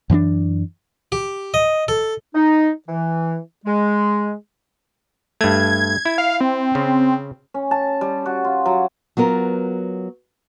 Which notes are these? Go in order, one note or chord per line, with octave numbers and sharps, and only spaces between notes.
F#2 E3 B3 D4
G4
D#5
A4
D#4
E3
G#3
G2 A3 G#6
E4
F5
C4
C#3
C#4
A5
G3
F#4
F4
F#3
F#3 B3 F4 A#4